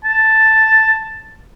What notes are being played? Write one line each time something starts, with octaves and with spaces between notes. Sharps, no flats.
A5